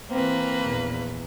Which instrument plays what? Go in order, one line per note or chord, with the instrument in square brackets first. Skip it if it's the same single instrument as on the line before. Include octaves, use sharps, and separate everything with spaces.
[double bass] E3 C4 [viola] A#3 B4
[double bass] A#1 E2